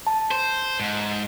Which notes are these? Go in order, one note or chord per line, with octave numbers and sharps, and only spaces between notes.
A5
C5
G#2